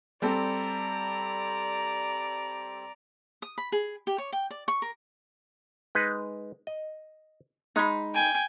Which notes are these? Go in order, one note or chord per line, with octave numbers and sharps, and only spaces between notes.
G3 C4 A4 D5 A#5
D#6
B5
G#4
G4
C#5
G5
D5
C#6
A#4
G#3 D#4 B4
D#5
G#3 D#4 B5
G5 G#5